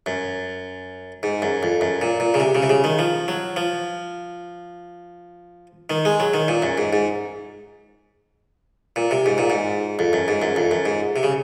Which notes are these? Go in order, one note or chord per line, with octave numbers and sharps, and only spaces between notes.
F#2
G#2
F#2
F2
F#2
A#2
A#2
C#3
C3
C#3
C3
C#3
D#3
F3
F#3
F3
D#3
G#3
F#3
D#3
A#2
F#2
G#2
G#2
A#2
C3
G#2
A#2
G#2
F2
F#2
G#2
F#2
F2
F#2
G#2
C3
C#3